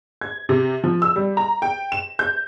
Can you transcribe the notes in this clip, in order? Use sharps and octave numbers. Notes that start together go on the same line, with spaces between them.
G#6
C3
F3
E6
G3
A#5
G5
E7
G6